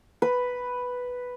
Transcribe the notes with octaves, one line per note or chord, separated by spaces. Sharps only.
B4